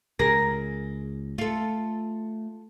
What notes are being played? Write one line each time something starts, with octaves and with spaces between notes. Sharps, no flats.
C#2 G#4 A#4 A#6
A3 F4 A4